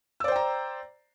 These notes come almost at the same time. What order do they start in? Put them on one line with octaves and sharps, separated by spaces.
E6 D5 C5 G5 A#5